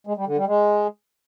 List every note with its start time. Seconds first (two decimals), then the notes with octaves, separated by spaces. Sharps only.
0.07 G#3
0.17 G3
0.27 D3
0.37 G3
0.47 G#3